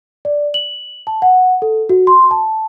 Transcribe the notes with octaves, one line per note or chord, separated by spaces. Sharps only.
D5
F#7
A5
F#5
A4
F#4
C6
A5